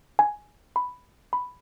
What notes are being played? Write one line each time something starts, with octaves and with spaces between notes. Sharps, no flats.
G#5
B5
B5